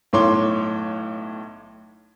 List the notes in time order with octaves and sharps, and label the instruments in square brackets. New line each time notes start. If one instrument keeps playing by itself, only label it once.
[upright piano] B1 A2 C#5 C6 D6 G7